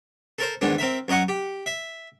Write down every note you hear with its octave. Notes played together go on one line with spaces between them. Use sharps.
A4 A#4 C5
E2 G#2 D#3 D4
C4 A#4 E5
F#2 A#4 D#5 F#5 C#6
G4
E5